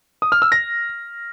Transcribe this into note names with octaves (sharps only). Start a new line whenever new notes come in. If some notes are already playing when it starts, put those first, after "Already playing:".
D#6
F6
E6
A#6